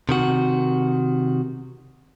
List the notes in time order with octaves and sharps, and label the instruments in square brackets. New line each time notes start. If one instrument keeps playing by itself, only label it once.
[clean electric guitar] C3 D#3 F#4